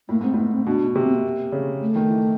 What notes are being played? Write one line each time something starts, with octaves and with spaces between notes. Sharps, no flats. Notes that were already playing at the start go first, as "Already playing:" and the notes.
A2 A#3
G#2 C4
A2 B3
C4
B2 D4
C3 B3
C4
A#3
C#3
A3
D#3
E3